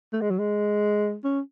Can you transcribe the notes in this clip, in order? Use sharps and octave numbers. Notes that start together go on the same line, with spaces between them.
A3
G#3
F#3
G#3
C#4